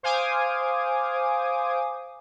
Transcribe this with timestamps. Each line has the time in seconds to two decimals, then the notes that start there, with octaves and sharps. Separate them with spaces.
0.03 C5 F5 G#5 D6 D#6